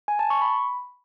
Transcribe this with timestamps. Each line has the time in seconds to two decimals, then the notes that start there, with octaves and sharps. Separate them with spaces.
0.08 G#5
0.19 A5
0.30 C#6
0.41 B5